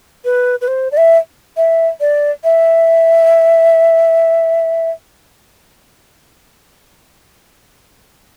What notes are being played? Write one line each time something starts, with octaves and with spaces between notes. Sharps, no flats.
B4
B4
C5
D5
E5
E5
D5
E5